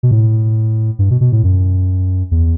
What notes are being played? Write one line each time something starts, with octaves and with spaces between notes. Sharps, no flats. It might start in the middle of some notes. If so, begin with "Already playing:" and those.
B2
A2
G2
B2
B2
A2
F#2
E2